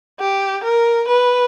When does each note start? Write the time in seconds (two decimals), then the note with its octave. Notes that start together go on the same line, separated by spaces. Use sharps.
0.20 G4
0.63 A#4
1.08 B4